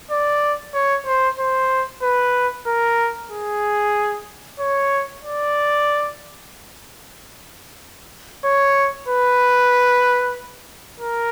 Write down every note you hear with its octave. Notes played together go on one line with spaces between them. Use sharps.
D5
C#5
C5
C5
B4
A#4
G#4
C#5
D5
C#5
B4
A#4